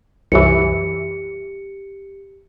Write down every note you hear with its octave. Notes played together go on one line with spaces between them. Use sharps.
C2 F#2 E3 G4 C#7